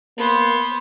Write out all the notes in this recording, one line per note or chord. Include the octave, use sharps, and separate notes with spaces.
A#3 B3 C5